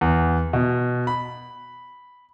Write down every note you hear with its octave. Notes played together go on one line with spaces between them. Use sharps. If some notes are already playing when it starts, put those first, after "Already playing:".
E2
B2
B5